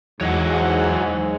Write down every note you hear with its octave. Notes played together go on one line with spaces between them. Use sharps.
E2 G#2 F#3 C#5 D#5 F#5